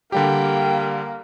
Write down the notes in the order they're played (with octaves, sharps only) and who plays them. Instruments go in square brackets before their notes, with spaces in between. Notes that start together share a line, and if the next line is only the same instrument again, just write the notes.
[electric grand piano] D3 G3 G4 [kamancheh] A#3 [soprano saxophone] G5